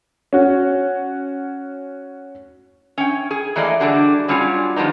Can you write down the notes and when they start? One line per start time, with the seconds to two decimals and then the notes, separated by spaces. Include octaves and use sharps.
0.33 C#4 F#4
2.98 C#4 G5
3.31 G#4
3.56 E3 A3 A#3 G#4 D5 D#5
3.80 D3 G3 D4 F#4 G#4
4.28 F#3 G3 C#4 D4 F4 G#4
4.76 D#3 F3 G3 B3 D4 D#4